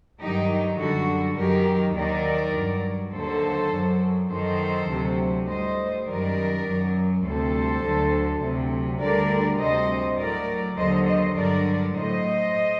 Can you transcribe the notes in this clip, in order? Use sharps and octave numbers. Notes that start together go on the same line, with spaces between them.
G2 D#3 F#3 D#4 G4
F#2 D3 G3 F#4 A4
F#2 D#3 F#3 G4 A#4
D#2 D#3 F#3 A#4 D5
G2 F#3
D#2 D3 F#3 A4 C5
F#2 F#3
F#2 D#3 F#3 A4 C5
D2 C3 F#3
A2 G3 C5 D#5
F#2 D#3 G3 A#4 D5
F#2 F#3
D2 C3 G3 A4 C5
D2 D3 F#3
D2 C3 F#3
D2 D3 G3 A#4 D5
D2 C3 G3 C5 D#5
A2 F#3 A#4 D5
D#2 D3 F#3 C5 D#5
C5 D#5
G2 D3 F#3 A#4 D5
A2 F#3 C5 D#5